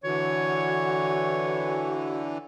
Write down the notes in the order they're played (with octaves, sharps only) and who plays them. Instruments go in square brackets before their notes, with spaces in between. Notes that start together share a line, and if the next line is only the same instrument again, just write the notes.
[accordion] D3 E3 [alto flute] F#4 [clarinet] C#5